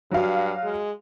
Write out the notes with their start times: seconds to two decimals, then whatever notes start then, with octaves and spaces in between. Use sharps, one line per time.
0.11 G2 F#3 F5
0.64 G#3